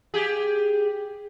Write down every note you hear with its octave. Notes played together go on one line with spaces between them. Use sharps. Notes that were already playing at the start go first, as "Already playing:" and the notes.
G4 G#4